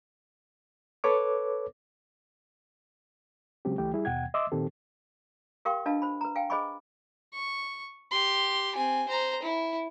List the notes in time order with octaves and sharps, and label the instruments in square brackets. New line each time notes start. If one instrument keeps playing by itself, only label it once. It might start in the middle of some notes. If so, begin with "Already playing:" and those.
[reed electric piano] A4 B4 C#5 D6
C#3 F#3 G#3 C4 C#4 G4
C#2 E3 A3 G4 G5
G3 E4 G#4
D#2 B2 F#5 G5 G#6
D#5 E5 C6 D6 E6
A#2 D#3 C4 G4 A4
[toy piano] G4 A#4 F5 G5 C6 C#6
D4 F4 B4 D#5 F5 A5
C5 B5
B4 A#5
F5 G5 G#5
G#4 C5 D#5 G#5 B5 C#6
[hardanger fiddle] C#6
G4 C6
C4 G#5
C5 A#5
E4